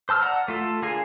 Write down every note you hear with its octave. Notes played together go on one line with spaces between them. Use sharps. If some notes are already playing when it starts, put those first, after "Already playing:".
C5 A5 E6 F6
D5 F#5 A5 A#5
A3 F4 A4
D3 G#4 A#4 F5 G#5